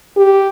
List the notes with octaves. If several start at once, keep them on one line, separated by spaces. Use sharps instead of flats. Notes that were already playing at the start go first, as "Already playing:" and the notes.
G4